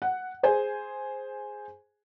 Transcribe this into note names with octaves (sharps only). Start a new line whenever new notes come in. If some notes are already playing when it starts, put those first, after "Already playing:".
F#5
G#4 C5 G#5